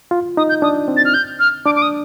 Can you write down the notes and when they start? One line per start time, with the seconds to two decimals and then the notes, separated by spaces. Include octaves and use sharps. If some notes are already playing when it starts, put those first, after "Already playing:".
0.11 F4
0.37 D#4 D#6
0.49 G6
0.62 D4 D#6
0.88 C4
0.97 A6
1.05 F6
1.14 G6
1.40 F6
1.65 D4 D6
1.76 D6
1.82 D#6